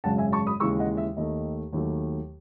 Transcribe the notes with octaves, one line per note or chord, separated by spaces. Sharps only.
G#1 F#2 C#3 G#3 F#5 A5
E5 G#5
A5 C#6
B5 D#6
D#2 C#3 E3 G#3 C#6 E6
D#5 F#5
E5
D#2 D#3 A3 D#5
D#2 D#3 F#3 A3